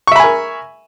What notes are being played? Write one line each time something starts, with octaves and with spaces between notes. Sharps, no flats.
A#4 E5 G#5 B5 C#6